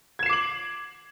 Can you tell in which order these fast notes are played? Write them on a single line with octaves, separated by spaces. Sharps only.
G#6 E7 C7 D6 F#7